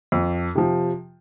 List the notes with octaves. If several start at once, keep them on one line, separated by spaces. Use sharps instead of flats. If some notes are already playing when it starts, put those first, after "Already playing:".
F2
C3 F3